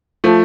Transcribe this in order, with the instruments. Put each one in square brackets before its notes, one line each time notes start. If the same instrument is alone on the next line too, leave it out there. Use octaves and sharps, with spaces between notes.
[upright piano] F3 A3